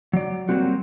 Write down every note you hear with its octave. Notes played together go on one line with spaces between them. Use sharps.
F#3 D5
F#3 G3 A#3 C4 F#4